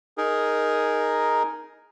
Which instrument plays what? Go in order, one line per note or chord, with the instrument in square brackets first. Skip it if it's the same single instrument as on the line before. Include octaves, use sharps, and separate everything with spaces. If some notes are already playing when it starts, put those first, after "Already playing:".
[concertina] D#4 G#4 A#4